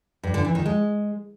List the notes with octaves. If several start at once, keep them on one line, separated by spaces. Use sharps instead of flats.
G2
D3
E3
D#3
G#3